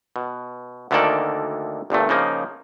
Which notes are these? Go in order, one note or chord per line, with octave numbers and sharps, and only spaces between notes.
B2
D2 D3 D#3 A#3 A4 D5
G1 G2 A#2 A3
C#3 F3 A#3 D#4